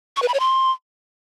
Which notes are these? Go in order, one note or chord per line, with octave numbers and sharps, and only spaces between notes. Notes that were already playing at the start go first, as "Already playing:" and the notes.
C#6
B4
B5
C#5
C6